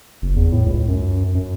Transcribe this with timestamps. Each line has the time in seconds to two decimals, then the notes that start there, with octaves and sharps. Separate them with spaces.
0.22 F#1
0.36 E2
0.52 A2
0.66 C#2
0.88 F#2
1.35 F#2